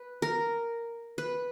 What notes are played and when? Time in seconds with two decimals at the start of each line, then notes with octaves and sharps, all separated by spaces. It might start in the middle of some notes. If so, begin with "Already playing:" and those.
Already playing: B4
0.22 A#4
1.18 B4